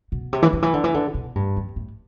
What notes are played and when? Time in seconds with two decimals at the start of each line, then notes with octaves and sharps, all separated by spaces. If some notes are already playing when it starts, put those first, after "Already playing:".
0.12 B2
0.33 C3
0.42 E3
0.53 D3
0.62 E3
0.74 D3
0.84 E3
0.94 D3
1.14 B2
1.35 G2
1.57 F2
1.76 A2